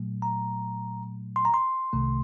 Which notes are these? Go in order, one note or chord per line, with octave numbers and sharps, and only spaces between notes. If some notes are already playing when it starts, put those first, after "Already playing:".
Already playing: A#2 F#3 A3
A#5
C6
A#5
C6
C2 C3 D#3 A3